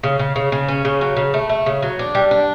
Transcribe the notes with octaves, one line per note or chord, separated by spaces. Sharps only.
C#3
C#3
C#3
C#3
C#4
C#3
F#3
C#3
A3
A3
C#3
F#3
D4
G3
D4